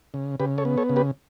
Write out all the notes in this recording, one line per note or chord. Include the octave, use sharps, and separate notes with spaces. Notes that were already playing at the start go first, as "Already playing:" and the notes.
C#3
C#3 G4 B4
A4 C#5
B3
A4 C#5
C#3
G4 B4